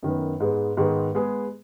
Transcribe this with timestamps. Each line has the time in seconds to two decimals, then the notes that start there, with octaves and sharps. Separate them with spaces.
0.03 F#2 D#3 B3
0.40 G#2 G#3 B3
0.77 G#2 D#3 G#3 B3
1.15 G#3 B3 G#4